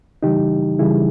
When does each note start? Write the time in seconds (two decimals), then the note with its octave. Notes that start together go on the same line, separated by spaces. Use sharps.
0.23 C#3 E3 G3 D#4 G4
0.79 C#3 E3 G3 E4 G#4